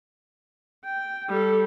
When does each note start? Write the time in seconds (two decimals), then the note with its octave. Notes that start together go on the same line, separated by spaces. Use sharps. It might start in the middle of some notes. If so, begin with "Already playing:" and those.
0.85 G5
1.29 G3 A4